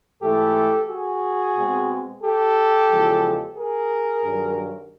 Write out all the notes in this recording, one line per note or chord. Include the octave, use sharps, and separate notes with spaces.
G#2 E3 A3 G4 A4
F#4 G#4
B2 G#3 C4
G4 A4
E2 C#3 F3 G#3
G#4 A#4
G2 D#3 F#3